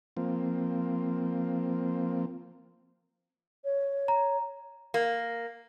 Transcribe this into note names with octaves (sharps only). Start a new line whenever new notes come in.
F3 A#3 C4
C#5
A#5
A#3